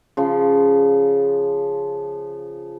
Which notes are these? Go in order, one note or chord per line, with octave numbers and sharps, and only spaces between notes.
C#3 F3 C6